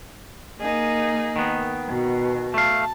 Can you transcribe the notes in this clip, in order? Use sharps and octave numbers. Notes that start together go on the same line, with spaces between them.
A#3 D#4 G#4
D#3 B3
B2
A3 F5 A5